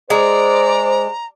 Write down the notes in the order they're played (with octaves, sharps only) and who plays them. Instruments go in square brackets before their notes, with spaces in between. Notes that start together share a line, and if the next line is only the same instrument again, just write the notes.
[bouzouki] G#3 [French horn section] C5 [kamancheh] D5 [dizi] A#5